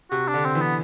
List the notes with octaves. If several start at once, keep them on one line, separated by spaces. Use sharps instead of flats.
C3 F#4
D4
D3
C4
E3
B3